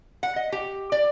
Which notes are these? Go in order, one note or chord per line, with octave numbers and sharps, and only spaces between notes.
F#5
D#5
G4
D5